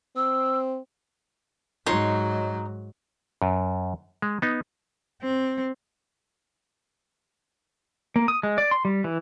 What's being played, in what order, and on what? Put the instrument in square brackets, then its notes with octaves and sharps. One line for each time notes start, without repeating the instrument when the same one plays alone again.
[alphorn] C4 [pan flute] E6
[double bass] G#2 F#3 [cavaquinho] D#4 C#5 C6
[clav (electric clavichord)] F#2
G#3
B3 D#4
[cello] C4
[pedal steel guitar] A#3
D#6
G#3
D5
C6
G3
E3